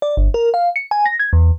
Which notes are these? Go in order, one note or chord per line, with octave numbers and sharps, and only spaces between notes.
D5
G1
A#4
F5
C#7
G#5
A#6
G#6
E2